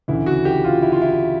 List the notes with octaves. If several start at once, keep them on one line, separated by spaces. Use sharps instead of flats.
D2 C#3 E3 E4
F#4
G4
F4
E4
F4
E4